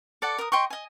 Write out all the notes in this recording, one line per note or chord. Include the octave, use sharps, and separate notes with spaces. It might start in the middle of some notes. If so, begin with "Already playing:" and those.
A4 D5 F#5
A#4 D#6
D#5 G5 C6 C#6
D#5 G#5